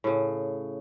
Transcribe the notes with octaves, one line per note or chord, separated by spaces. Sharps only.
A2 C#3